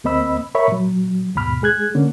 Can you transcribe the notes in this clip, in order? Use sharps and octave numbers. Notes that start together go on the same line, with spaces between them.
D2 A#3 C4 D#5 B5 E6
A#4 C#5 E5 B5 C#6
A#2 F#3
D#2 G#2 B2 B5 F6
G#3 G#4 F#6 G#6
D3 A#3 C#4